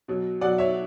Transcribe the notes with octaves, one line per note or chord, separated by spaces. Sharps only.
B2 F#3
B2 F#3 D5 F#5
C#5 E5